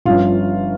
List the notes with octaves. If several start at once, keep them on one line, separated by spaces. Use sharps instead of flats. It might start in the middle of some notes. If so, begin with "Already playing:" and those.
G1 G2 F3 C#4 F4